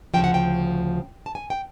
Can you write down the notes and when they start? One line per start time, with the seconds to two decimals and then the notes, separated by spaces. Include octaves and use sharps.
0.14 D2 C#3 F3 G5
0.24 F#5
0.34 G5
1.26 A5
1.35 G#5
1.50 G5